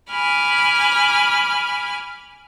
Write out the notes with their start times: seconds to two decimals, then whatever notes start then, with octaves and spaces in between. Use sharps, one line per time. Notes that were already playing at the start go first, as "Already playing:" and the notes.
0.11 G#5 B5 D6 F6